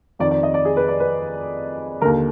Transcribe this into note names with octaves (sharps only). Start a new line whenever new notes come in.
F2 D#3 D5
D5
D#5
D5
G#4
B4
D5
B4
D#2 D3 A#4